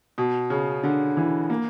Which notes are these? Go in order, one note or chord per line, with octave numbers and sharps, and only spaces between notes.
B2
C#3
D3
E3
A#3